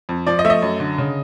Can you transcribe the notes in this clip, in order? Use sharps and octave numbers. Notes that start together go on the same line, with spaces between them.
F2
F3 D5
D#5
A3 E5
D#5
F#2
D3
C#3